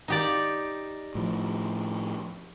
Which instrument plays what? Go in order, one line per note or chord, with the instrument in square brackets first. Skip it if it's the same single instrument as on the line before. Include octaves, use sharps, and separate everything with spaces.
[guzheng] D#4 G4 D5
[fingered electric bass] A2 F3